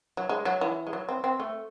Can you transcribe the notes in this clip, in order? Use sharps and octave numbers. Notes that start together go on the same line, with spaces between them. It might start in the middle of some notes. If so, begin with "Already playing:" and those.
F#3
G#3
F#3
E3
G#3
F#3
C4
C4
A3